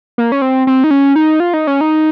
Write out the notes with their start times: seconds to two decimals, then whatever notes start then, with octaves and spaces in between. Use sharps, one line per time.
0.18 A#3
0.32 C#4
0.42 C4
0.67 C4
0.84 D#4
0.91 C#4
1.16 D#4
1.40 F4
1.54 D#4
1.67 C#4
1.81 D#4